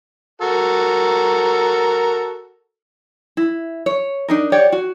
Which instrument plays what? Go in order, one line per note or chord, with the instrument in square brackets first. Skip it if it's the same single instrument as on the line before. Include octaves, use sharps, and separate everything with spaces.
[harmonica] F#4 A4 A#4
[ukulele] E4
C#5
D4 D#4 A#4
G4 C#5 D5 F#5
F#4